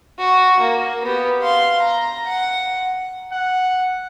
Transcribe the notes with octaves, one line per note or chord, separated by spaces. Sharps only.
F#4
A#3
B3 G4
F5 C6
A#5
F#5
F#5